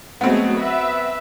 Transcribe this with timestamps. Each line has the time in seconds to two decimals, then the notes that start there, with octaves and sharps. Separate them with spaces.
0.21 F#3 G#3 A3 B3 C4
0.58 B4 E5